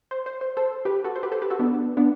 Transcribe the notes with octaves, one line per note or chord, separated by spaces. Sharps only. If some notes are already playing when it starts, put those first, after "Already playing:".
C5
C5
C5
A4 C5
G4 B4
F#4 A4
C5
G4 B4
A4 C5
G4 B4
F#4 A4
B3 D4
B3 D4